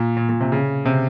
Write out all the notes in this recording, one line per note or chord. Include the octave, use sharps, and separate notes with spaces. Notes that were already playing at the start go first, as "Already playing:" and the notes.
Already playing: A#2
A#2
A#2
C3
C#3
C3